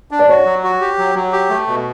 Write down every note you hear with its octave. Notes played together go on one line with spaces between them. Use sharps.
D4
D5
F#4 C#5
F#3
F#4
G4
F#3
F#3
G4
A3
B2